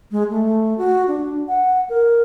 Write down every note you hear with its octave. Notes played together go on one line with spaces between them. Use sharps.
G#3
A3
F#4
D4
F#5
A#4